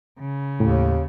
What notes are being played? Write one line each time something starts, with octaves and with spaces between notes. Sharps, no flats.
C#3
D#2 A2